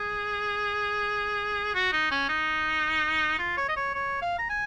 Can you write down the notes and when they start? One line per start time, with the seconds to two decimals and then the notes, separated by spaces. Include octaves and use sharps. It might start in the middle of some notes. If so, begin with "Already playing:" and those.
Already playing: G#4
1.75 F#4
1.92 D#4
2.11 C#4
2.29 D#4
3.39 F4
3.57 C#5
3.69 D#5
3.76 C#5
3.94 C#5
4.22 F5
4.38 A#5
4.50 G#5